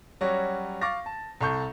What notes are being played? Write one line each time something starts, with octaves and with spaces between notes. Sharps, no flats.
F#3 G3 C#4 F#4
F5 C#6 D6 A6 A#6
A5
C2 A4 C#6 G6